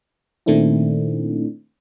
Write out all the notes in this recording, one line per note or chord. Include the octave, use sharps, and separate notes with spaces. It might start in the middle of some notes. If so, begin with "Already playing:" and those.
A#2 D#3 A3 C4 D4 E4